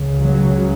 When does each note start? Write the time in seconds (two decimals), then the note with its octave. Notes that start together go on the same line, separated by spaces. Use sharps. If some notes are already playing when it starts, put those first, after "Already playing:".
Already playing: C#2 C#3
0.22 F#3